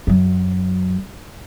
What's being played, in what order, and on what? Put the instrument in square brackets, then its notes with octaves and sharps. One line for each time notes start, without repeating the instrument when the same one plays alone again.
[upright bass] F#2 F#3